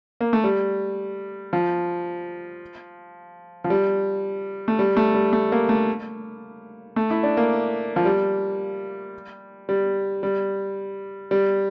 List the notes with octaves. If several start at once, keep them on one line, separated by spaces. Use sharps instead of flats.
A#3
A3
G3
F3
F3
G3
A3
G3
A3
G3
A3
A#3
A3
A3
E4
D4
A#3
F3
G3
G3
G3
G3